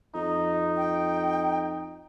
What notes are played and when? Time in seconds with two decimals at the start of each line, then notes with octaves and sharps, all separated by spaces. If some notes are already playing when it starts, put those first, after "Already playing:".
0.15 F2 D#4
0.77 G5